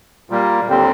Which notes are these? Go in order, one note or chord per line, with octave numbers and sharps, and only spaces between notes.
A#2 G3 A#3
D#2 D3 G3 C4